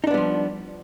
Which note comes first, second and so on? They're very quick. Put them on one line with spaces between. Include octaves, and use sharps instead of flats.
D#4 D4 B3 G3 F3